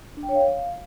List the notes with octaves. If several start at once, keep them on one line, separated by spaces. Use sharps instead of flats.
D4
G5
C#5
F5